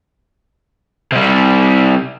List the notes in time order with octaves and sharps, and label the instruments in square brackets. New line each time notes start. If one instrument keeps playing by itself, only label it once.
[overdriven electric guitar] C3 G3